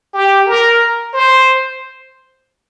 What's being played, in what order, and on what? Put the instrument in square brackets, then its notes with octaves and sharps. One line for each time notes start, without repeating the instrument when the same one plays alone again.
[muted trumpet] G4
A#4
C5